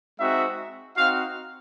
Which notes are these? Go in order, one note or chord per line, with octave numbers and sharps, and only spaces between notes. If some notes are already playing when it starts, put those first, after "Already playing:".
G#3 C4 D#4 F#4 E5
C4 D#4 F#4 F5